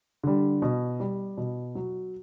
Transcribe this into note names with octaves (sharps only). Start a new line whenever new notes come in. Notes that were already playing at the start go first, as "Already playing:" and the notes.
D3 G3
B2
G3
B2
F#3